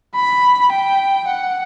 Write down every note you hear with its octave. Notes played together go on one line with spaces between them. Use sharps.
B5
G5
F#5